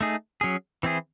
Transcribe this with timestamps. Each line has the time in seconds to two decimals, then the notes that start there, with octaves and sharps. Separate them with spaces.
0.01 A3 D#4 G#4
0.41 F#3 C#4 G#4
0.83 E3 C4 E4 G#4